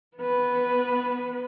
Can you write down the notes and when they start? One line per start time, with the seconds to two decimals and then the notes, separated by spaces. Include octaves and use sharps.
0.17 B3 B4